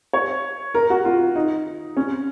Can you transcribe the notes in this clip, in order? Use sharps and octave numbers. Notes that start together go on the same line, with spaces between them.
C#5
A#4
F#4
F4
D#4
C#4